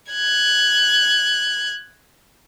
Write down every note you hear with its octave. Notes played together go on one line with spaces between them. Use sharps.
F#6 G#6